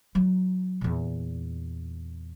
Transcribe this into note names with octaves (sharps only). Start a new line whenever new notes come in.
F#3 D#4
E2 A#2